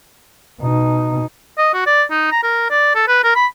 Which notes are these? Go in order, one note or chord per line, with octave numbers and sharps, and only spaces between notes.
B2 D#4
D#5
F#4
D5
D#4
A#5
A#4
D5
A4
B4
A#4
B5